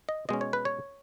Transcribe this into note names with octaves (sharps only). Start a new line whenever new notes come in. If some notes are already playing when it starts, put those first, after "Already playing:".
D#5
B2 G#3 C#4 D#5
C#5
B4
C#5